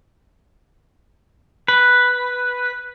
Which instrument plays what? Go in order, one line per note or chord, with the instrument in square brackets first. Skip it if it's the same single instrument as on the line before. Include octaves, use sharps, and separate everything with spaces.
[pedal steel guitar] B4